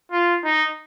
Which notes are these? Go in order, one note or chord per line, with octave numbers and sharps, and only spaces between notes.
F4
D#4